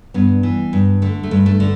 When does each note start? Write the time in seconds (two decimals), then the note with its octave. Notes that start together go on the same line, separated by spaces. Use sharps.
0.14 G2 B3
0.43 E3
0.73 G2
1.02 D3 A3
1.23 A3
1.31 G2
1.46 A3
1.60 D3